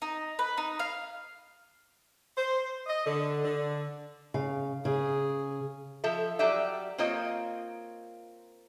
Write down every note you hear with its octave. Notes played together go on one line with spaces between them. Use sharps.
D#4
B4
D#4
F5
C5
D#5
D3
D3
C#3 F5
C#3 G#4
F3 A4 E5
F#3 G3 G4 D5 E5
A#3 C4 F4 C#5 D#5